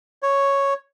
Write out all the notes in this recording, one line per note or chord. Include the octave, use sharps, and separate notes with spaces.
C#5